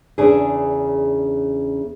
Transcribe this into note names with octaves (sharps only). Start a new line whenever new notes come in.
E2 C#3 D4 G#4